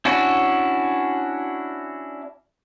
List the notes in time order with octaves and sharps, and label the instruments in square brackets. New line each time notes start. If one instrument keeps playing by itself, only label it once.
[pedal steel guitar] C#4 D4 E4 F#4